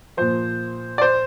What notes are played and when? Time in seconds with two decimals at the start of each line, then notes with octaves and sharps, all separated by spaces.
0.17 A#2 F3 C5
0.98 D5
1.02 C5